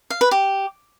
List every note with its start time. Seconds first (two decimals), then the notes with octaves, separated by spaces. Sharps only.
0.10 F5
0.21 B4
0.31 G4